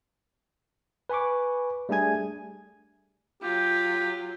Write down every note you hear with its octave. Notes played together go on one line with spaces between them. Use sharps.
B4 G#5 B5 C#6 D6
G3 A3 D4 G#4 G#5 G#6
F#3 F4 G4